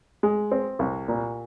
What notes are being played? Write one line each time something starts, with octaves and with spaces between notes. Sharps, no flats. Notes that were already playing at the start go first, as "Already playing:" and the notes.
G#3
C4
C2
A#2